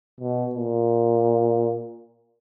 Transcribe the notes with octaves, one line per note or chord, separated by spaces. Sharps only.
B2
A#2